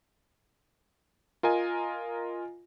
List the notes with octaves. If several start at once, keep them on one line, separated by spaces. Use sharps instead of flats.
F4 A#4 D#5 G#5